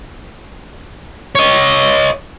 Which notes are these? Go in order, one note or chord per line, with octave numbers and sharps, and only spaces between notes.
C#5 D#5